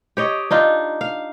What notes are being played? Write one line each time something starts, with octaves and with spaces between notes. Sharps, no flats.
G4 C#5 D#5
D4 D#4 F4
F5